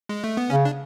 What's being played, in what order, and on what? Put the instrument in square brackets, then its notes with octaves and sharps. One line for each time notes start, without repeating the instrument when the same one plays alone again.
[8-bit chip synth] G#3
A3
B3
[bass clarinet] C#3 [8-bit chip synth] C#4
[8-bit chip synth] D4